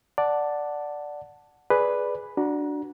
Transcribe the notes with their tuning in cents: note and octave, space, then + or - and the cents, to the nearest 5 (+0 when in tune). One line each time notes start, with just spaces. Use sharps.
D5 +0 F#5 -5 A5 +5
G#4 +10 B4 +0 D5 +0
D4 +0 F#4 +0 A#5 +35